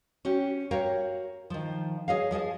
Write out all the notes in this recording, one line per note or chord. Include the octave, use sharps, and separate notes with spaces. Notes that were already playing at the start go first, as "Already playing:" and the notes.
C#4 F#4 G4
F#4 G4 A#4 C#5 F5
D#3 F3
G#4 C#5 D#5 F5
F3 G#4 D#5 A5